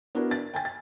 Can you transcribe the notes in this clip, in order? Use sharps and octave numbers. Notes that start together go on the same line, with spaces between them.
B3 D4 E4 F#4 A#4
A6
G5 G#5 A6
A6